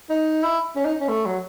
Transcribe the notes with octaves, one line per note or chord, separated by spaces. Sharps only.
D#4
E4
C#4
D#4
C#4
A3
F#3